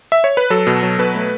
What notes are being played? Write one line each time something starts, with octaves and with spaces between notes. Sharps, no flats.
E5
C#5
B4
F#3 A4
B2
F#3
B2 B4
A3